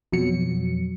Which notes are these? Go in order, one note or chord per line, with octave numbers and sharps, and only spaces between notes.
F2 B2 F#3 C#7